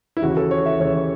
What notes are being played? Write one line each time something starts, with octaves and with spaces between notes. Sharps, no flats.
E4
D#2 C#3 E3 F#4
A4
C#5
E5
D#2 C#3 E3 C#5